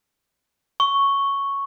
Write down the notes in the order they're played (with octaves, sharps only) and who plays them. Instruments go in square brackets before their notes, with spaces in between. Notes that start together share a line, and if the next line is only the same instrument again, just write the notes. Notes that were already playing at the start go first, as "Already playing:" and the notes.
[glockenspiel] C#6